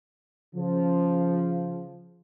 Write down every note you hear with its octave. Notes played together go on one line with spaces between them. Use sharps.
C#3 F3